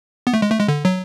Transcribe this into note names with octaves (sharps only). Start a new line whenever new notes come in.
B3
A3
G#3
A3
G#3
D3
F#3